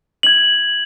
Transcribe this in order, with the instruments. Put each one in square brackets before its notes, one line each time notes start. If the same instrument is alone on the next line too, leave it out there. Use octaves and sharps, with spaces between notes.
[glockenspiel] G#6 F#7